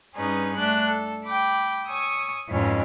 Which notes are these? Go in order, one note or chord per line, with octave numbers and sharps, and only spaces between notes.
G2 C#4 D#4 G#4 B4
A3 D4 F#6
A4
G5 B5 D6
C#5 G#5 C#6 D#6 E6
F2 G#2 E3 F3 C#4